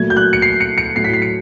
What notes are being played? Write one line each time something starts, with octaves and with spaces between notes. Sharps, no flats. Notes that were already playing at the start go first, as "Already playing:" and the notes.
Already playing: A#2 F#3 A3 G#6
G6
F#6
C#7
C7
C#7
C#7
A2 F#3 A3 C7
B6
C7
C#7